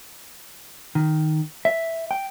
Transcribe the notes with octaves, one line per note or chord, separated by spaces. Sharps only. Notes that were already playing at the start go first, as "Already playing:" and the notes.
D#3
E5
G5